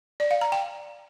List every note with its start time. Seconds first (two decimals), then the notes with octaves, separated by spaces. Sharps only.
0.20 D5
0.31 F5
0.41 A#5
0.52 G5